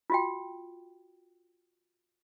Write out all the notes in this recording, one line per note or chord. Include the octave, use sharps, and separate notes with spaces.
F4 F#4 G5